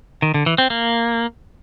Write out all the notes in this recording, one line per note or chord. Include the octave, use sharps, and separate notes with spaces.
D#3
D3
E3
C4
A#3